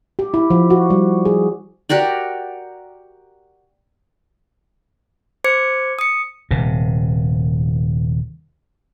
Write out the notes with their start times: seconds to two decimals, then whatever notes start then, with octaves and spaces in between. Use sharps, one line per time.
0.19 G4
0.34 E4
0.50 F3
0.70 F#4
0.90 G3
1.25 G#4
1.89 F#4 G4 A#4 D5
5.44 C5 D6 G#6 C#7
5.99 D#6 C#7
6.51 D#1 C3